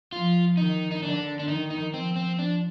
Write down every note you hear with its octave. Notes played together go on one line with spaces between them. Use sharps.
F3 F4
D#3 D#4
D#4
D3 D4
D4
D#3 D#4
D#4
F3 C4
C4
F3 D4